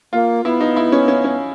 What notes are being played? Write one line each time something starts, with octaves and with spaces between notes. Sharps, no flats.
A#3 F4
B3 E4
D#4
E4
C#4
C#4
C#4